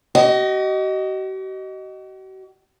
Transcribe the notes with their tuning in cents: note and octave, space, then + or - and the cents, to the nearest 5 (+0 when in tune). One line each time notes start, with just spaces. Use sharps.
F#4 +45 D#5 +0